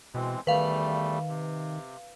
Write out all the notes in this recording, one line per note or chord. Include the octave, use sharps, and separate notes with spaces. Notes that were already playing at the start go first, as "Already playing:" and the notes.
B2 E3 G#3 C4
E2 D#3 G3 A3 B4 F5
C3